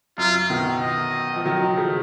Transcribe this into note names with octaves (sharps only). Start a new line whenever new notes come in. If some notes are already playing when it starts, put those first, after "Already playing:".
F#2 F4
B2 D#3
D#5
F3
D#3 F#3
C#3 F3